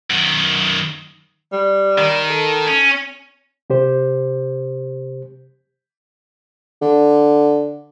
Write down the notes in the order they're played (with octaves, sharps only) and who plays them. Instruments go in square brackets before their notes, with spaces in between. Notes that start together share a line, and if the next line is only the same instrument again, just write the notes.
[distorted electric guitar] F#2 D#3
[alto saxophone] G3
[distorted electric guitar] D#3
[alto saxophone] A4
[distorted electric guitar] C#4
[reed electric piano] C3 G4 C5
[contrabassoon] D3